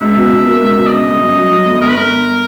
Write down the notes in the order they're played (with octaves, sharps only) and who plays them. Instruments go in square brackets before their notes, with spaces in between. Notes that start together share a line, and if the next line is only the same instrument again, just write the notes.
[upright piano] C#2 [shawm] E5
[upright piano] B2
B2
A#3
C#2
B2
[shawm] D5
[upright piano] C#3 [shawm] D#5
[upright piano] G1
F#2
F#3
F#3
G1
[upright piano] G1 [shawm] A#4
[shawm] B4
[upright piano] G1 [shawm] A#4
[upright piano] G1